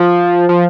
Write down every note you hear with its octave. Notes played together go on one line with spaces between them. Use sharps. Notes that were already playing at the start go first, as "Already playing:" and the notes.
Already playing: F3
F3